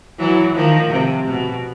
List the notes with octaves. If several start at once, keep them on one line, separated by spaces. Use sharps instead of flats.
E3 F#3
D#3 F3
C3
B2